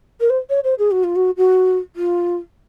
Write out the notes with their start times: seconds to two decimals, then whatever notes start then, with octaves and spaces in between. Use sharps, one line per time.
0.20 A#4
0.30 C5
0.49 C#5
0.64 C5
0.78 G#4
0.91 F#4
1.03 F4
1.15 F#4
1.37 F#4
1.96 F4